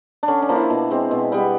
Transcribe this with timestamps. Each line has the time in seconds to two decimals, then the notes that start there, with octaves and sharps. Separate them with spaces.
0.23 D4
0.28 D3 C#4
0.42 D4
0.49 F3 A#3
0.55 E4
0.70 B2
0.90 G#3 C4
1.11 B2
1.32 G3 B3